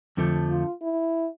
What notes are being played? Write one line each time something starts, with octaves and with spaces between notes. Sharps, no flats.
F2 D3 F3 A3
F4
E4